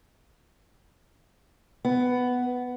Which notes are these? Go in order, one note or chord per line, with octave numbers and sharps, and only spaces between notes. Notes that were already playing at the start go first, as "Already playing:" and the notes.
B3